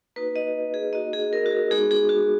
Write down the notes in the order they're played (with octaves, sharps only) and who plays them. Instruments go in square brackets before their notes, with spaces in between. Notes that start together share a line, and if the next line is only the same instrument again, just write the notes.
[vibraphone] A#3 D#4 F#4 B4
D#5
G#4
A#3 D#4 F#4 D#5
G#4
A#4
F#4
G#4
G#3 B3 D#4 F#4 G#4
G#4
F#4